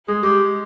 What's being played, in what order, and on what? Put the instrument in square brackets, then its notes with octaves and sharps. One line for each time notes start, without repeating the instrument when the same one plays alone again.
[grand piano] G#3 [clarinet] G#4
[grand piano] G#3 [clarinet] G4